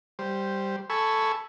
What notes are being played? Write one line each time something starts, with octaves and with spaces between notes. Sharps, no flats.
G3 C5
A4 G#5 B5 C#6 E6